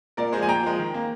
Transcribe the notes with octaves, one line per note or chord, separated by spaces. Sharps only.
A#2 A#4 D5
F3 G#3 G#4 C5
G#5
A#2 G5 A#5
F3 G#3
D#3
A#3